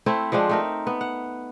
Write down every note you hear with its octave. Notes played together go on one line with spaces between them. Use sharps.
A3 C4 E4
F3 G#3 C4 D4
A3 D#4 A#4
B3
F#5